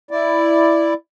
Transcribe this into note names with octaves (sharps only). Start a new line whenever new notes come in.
E4 D5